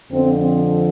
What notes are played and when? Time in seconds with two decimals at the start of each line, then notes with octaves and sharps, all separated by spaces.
0.11 F2 D3 F3 C4
0.41 C4